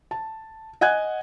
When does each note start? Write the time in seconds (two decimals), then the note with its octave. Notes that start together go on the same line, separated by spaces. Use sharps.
0.11 A5
0.81 D#5 F#5 G#5 F#6 G#6